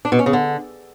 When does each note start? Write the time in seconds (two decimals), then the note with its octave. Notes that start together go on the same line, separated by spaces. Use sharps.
0.05 D4
0.12 B2
0.19 C#4
0.26 C#3
0.33 D3